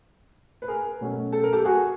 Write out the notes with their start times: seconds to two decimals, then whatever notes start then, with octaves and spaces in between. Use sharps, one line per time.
0.62 B4
0.68 G#4 A#4
1.01 B2 F#3 A3 C#4
1.33 A4
1.43 A#4
1.53 G4 A4
1.65 F#4 G#4